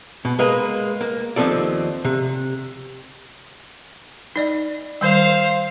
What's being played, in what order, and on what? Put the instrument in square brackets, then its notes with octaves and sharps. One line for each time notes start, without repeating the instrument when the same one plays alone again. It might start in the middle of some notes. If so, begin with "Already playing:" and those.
[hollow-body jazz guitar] B2
G#3 A#3 B4
A#3
D#2 F3 C4 A4 D5
C3
[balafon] D#4 D5 D#5
[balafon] D#3 G3 [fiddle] C5 F5